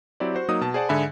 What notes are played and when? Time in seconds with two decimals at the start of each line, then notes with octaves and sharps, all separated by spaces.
0.20 F#3 C4 E4 G4 D5
0.35 F#4 C5
0.49 F#3 A#3 D#4 D#6
0.61 B2 A5
0.74 G#4 C5 D5 F#5 A5
0.89 G#2 D3 G#4 E5 G#5 B5